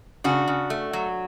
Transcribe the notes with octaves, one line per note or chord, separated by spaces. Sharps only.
C#3 D4 F#4
C#3
A3
F#3